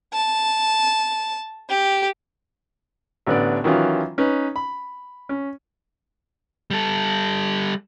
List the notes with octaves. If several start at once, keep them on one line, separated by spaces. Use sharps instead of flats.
A5
G4
A1 D3 B3 D5
D#3 E3 F#3 C#4 F4
C#4 D#4 B4
B5
C#4
G3 A4